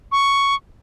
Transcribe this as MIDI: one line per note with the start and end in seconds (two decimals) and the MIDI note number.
0.12 0.55 85